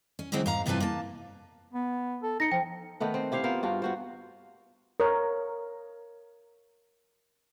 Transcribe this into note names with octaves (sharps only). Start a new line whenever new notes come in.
C#4
D3 E3 F#3 G#3 C4
G#2 F5 A#5
G2 C3 E3 F4 B4 A5
A#3 A5
B3
A4
D#4 A#6 C#7
F3 G5
D#3 A3 B3 B4
C4
E4 G4 C5 F5
B3 F4 A#4 C5
G2 F4 F#4
B3 F#4 C5
A#4 C#5